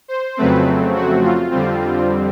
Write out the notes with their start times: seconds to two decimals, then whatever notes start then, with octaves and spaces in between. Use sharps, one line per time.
0.08 C5
0.37 F2 C#3 F#3 A3 C4 B4
0.95 F#4
1.24 F4
1.51 F2 D3 G3 C4